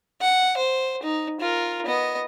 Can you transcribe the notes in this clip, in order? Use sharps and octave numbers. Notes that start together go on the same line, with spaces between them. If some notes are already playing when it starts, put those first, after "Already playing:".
F#5
C5
D#4
F4 A#4
B3 D#5